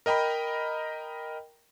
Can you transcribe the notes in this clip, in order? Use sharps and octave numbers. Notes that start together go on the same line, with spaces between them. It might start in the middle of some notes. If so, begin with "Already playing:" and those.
A#4 D#5 G5 A#5 B5